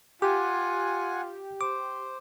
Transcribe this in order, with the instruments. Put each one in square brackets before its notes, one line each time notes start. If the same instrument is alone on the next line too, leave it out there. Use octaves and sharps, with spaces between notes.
[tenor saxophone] F4 [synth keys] G4 [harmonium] F#5 G#5 [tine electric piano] D6
[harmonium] C5 [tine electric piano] D6